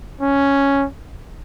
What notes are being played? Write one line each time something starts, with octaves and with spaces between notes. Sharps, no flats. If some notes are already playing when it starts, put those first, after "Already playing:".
C#4